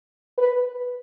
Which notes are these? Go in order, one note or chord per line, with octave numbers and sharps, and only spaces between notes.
B4